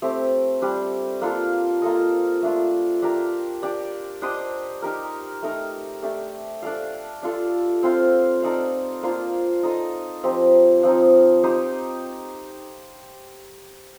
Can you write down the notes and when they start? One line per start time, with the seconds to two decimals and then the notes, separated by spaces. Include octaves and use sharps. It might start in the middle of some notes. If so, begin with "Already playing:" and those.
0.02 A3 C4 G4
0.62 G3 D4 G4
1.21 A#3 D4 F4 A4
1.82 A#3 F4 A4 D#5
2.42 A3 D4 F4
3.02 D4 G4 A#4
3.63 D4 G4 D5
4.22 D4 G4 C5 D#5
4.82 D#4 G4 A#4
5.42 A3 D#4 A#4
6.02 A3 D4 G4
6.63 D4 A4 D5 F5
7.22 D4 F4 A4
7.83 C4 F4 C5 F5
8.42 D#4 A4 D5 F5
9.03 A#3 D4 F4 C5
9.63 D#4 A4 C5 D#5
10.23 F3 C4 D#4 G4
10.83 F3 C4 D#4
11.43 D#4 G4 C5